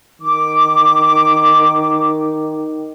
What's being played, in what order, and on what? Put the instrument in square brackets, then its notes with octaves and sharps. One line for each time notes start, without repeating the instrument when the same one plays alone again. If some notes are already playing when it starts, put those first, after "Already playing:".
[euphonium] D#3 [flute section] D6